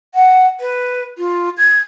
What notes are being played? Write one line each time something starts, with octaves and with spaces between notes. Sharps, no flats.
F#5
B4
F4
G#6